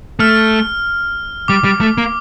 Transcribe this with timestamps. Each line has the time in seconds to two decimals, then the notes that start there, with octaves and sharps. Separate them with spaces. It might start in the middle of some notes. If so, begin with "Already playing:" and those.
0.19 A3 F6
1.48 G3 D6
1.64 G3
1.81 A3
1.98 A#3